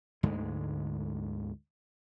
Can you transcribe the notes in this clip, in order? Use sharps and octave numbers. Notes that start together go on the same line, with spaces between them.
D2 G#2 D3 G#3